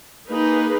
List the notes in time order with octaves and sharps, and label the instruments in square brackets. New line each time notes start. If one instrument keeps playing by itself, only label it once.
[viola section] A#3 D#4 G#4 B4